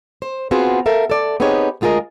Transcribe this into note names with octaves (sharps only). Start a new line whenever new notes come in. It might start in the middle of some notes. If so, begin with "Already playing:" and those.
C5
B3 C4 F4 F#4 G#4
A4 A#4 E5 F5
A4 D5
B3 C4 D#4 G4 G#4 C#5
D2 G#3 F4 G#4 A#4 D#5